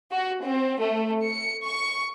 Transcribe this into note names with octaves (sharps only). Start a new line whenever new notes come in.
F#4
C4
A3
C#7
C#6